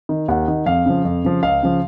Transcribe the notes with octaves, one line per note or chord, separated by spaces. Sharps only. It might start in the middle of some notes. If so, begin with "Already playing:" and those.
D#3
D#2 F#5
D#3
F2 F5
C#3 F3
F2
C#3 F3
C#2 F5
C#3 F3